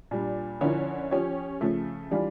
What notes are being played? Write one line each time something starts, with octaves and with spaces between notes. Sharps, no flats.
A#2 G3 D4
D3 F3 C#4 E4 A#4
F3 C#4 G4 C#5
C#3 F3 A3
E3 G3 D4 F4